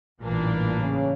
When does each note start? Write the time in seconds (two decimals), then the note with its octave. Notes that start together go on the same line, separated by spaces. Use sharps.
0.21 A1 G2 A#2 E3 A#3 D4
0.80 C#3